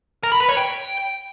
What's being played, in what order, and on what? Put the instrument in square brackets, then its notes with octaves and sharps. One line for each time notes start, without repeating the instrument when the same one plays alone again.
[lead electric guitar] A#4
B5
B4
C#5
G5